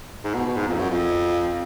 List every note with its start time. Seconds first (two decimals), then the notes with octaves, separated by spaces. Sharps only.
0.24 G#2
0.35 B2
0.46 B2
0.57 G#2
0.68 F2
0.78 F#2
0.90 F2